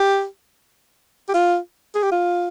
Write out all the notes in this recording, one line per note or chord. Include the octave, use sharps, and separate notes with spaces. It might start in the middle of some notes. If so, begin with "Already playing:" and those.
Already playing: G4
G4
F4
G#4
G4
F4